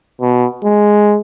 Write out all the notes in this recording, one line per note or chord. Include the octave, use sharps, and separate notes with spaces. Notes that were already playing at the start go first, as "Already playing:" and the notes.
B2
G#3